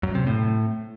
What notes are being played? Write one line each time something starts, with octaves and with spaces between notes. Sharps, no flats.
F#2
C3
A2